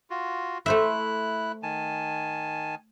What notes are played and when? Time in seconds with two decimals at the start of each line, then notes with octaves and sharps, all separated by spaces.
0.10 F4 F#4
0.66 A3 E4 C5 E5 F#6
1.63 D#3 G#5 A5